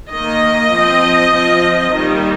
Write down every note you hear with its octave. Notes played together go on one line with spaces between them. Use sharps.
D#3 A#3 D#5
F3 C4
F3 C4
D#3 G3 A#3